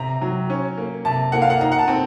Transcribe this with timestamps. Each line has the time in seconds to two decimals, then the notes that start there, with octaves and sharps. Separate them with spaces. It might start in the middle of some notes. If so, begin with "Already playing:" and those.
Already playing: C3 A#5
0.21 F#3
0.50 C#4
0.78 A#3
1.05 C3 A5
1.32 A#3 F#5
1.42 F5
1.50 F#5
1.61 D#4 A#5
1.72 F#5
1.78 A5
1.88 C4